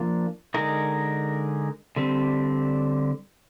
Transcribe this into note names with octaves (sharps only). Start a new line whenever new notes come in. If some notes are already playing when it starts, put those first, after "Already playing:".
Already playing: F3 A#3 D4
D3 G#3 D#4 A#4
D3 G3 C4